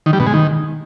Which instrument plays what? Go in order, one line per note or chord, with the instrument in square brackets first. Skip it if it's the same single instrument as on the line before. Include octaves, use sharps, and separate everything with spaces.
[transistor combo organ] D#3
G3
B2
G#3
D#3